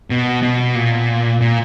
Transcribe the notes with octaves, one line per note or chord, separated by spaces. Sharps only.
B2
B2
A#2
A#2